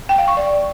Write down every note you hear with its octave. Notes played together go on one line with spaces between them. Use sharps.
G5
F5
C#6
D5